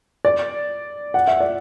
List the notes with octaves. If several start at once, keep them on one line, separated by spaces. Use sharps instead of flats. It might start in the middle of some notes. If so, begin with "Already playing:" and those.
D5
F#5
E5
D5